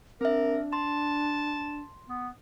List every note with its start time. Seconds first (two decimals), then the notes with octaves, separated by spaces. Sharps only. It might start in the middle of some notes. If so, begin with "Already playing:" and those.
0.21 C4 D4 A#4 E5
0.73 A5 C6
2.09 B3